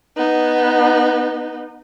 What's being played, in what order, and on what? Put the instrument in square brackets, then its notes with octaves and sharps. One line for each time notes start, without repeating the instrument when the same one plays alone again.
[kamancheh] B3 D#4